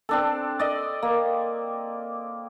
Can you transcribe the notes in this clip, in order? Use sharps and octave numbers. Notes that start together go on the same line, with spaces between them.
C4 D4 A4
D5 D#5
A#3